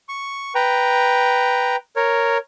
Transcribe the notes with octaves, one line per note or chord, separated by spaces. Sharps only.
C#6
B4 G5 A#5
A#4 C#5